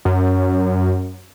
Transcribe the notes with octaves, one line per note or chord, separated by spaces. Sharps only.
F#2